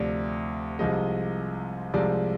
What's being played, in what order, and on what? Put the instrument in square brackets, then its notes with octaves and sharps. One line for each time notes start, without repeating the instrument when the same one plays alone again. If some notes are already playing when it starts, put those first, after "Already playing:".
Already playing: [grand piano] D2 C3 F3 D5
C2 C3 F3 G#3 D#5
C2 C3 F3 G#3 D5